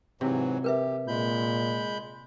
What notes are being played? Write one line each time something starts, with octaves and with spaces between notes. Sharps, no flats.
G#2 C3 E3 F#3
G4 A#4 B4 E5
A#2 G#3 B5 G6